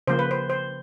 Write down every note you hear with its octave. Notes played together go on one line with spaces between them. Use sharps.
C#3 F3 A#3 C5
B4
C5
C5